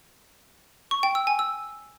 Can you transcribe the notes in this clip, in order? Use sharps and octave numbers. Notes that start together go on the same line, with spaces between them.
C#6
G5
E6
G#5
E6